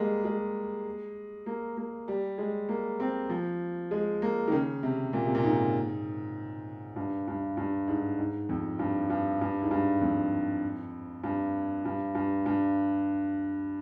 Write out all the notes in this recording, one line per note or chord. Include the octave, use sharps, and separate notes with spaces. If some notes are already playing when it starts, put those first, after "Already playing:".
Already playing: G3 G#3 A#3
G#3
A#3
A#3
G3
G#3
A#3
C4
F3
G#3
A#3
D#3
C#3
C3
A#2
C3
A#2
G#2
G2
G2
G2
G#2
G#2
F2
G2
G2
G2
G#2
G2
F2
G2
G2
G2
G2